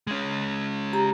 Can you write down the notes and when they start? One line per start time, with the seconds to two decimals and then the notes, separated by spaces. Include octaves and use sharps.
0.07 G#3 C#4
0.93 G4 A#5